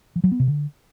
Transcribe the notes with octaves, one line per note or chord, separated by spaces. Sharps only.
F3
F#3
B3
C3
D3